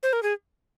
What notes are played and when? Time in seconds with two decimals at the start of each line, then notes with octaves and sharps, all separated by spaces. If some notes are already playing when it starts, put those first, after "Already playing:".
0.03 C5
0.13 A#4
0.23 G#4